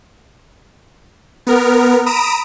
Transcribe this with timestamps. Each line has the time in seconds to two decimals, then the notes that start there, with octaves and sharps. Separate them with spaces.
1.47 B3 A#4
2.06 A#5 B5 D#6 D7 E7